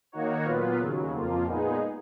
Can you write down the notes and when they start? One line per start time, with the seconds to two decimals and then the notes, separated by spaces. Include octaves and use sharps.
0.12 D#3 A#3 D#4 F#4 C#5
0.45 A#2 F#3 B3 F4 B4
0.79 D#2 C#3 F#3
1.12 F2 F3 A#3 F4
1.45 A#2 G#3 B3 D#4 G#4